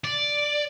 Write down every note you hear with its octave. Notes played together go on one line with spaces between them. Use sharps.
D5